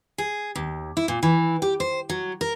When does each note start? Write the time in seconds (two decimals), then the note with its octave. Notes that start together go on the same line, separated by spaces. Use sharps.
0.18 G#4
0.55 D#2
0.97 E4
1.08 A#2
1.23 E3
1.62 G4
1.80 C5
2.09 F#3
2.41 A#4